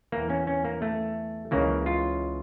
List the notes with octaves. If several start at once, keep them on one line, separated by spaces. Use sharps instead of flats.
E2 E3 A#3
C#4
C#4
A#3
A3
C#2 C#3 E3 A#3
F4